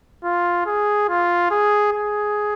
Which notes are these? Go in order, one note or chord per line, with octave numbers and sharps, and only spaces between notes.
F4
G#4
F4
G#4
G#4